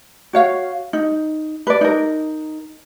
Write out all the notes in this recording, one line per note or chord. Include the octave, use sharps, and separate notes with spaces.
F#4 C#5 F5
D#4
B4 D5
D#4 A#4